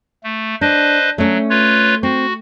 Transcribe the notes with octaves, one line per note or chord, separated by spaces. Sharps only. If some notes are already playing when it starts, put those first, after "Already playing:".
A3
D4 B4 C5 D#5
F#3 A3 C#4
F4 B4 C#5
C4 F#4